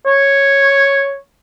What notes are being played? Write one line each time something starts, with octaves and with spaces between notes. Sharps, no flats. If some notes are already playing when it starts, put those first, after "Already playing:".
C#5